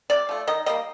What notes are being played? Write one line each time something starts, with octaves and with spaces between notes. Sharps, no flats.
C3 D5
F3 A3
D#3 D#5
G3 A#3 D#5